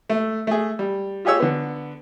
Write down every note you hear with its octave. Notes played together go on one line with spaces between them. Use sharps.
A3
A3 G#4
G3
F4 G4 G#4 C#5 E6
D3 B3